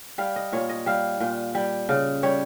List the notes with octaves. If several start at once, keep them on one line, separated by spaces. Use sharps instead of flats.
G3 F5
D#5
A#2 C#5
D#5
G3 F5
A#2
G3
C#3
G3 C#5